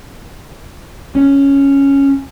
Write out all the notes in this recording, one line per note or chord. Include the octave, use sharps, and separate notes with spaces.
C#4